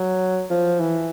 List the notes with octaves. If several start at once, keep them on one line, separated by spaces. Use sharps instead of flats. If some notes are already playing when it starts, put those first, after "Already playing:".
Already playing: F#3
F3
E3